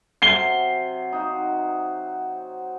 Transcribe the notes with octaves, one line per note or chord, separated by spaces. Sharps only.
C3 F#3 C7 G7
D#4 F#4